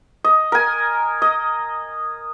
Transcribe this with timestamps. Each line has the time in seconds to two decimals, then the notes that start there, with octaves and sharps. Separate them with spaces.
0.24 D#5
0.52 A#4 G#5
1.22 D#5